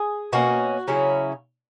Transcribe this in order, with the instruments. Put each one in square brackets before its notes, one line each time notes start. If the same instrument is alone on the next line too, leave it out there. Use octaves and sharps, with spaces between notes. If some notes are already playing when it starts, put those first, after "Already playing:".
Already playing: [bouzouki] G#4
B2 A#3 C#4 F#4
C#3 F#3 C#4 E4